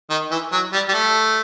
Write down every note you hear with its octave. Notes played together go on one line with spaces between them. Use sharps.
D#3
E3
F#3
G3
G3
A3